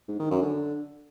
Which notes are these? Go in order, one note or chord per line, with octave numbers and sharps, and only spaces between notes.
G#2
D#3
F#2
D3